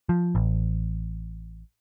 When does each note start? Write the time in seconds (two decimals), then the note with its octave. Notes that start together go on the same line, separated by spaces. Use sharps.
0.09 F3
0.35 A1